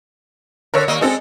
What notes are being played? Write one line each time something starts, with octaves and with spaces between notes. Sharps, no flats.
D3 A#4 C#5 E6
D#2 A#3 D#5
G#3 C4 A4 D#5